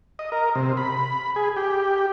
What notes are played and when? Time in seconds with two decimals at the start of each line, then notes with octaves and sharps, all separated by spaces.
0.19 D#5
0.32 A#4
0.55 C3
0.77 B5
1.36 G#4
1.56 G4